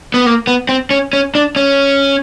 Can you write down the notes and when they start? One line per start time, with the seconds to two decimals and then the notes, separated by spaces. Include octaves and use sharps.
0.14 B3
0.26 A#3
0.47 B3
0.69 C4
0.91 C#4
1.13 C#4
1.35 D4
1.56 C#4